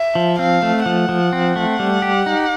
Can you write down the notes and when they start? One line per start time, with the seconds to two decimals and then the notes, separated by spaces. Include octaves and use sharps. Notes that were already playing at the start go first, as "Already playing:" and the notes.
Already playing: E5
0.15 F3
0.39 C4 F5
0.62 A3
0.86 F3 F#5
1.09 F3
1.33 C4
1.56 A3
1.79 G3
2.02 G4
2.26 D#4